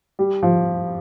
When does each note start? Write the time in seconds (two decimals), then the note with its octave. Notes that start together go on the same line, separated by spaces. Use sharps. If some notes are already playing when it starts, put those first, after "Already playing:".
0.19 G3
0.43 F3